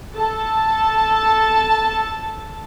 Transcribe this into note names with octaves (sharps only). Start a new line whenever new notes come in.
A4 A5